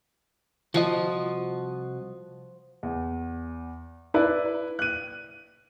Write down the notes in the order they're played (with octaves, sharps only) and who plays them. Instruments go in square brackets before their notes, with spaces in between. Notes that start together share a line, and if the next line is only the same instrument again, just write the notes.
[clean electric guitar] C2 F#4 D#5 [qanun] F3
[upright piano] E2
E4 B4 D5
F#6 D#7